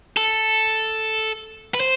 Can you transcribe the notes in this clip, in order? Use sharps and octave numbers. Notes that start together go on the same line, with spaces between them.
A4
B4
C5